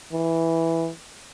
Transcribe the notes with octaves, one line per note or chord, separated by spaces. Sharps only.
E3